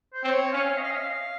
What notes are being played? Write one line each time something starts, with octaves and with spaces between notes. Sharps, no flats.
C5
C4 C#5
C#4 F5
D#5
F5
D#5
F5